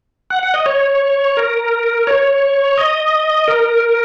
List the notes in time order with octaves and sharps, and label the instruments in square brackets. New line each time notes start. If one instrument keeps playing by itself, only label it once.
[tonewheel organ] F#5
F#5
D#5
C#5
A#4
C#5
D#5
A#4